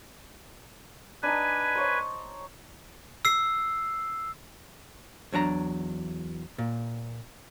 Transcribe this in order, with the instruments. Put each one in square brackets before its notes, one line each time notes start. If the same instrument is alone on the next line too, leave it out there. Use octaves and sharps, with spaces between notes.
[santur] D4 D#4 [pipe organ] B4 G#5
[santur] C5 C#5 A5
[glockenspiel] E6 C7
[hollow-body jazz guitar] E2 F#3 D4 A#5
A#2